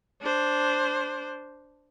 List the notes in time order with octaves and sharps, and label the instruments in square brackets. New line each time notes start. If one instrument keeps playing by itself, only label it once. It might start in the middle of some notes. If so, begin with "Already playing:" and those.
[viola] D4 C5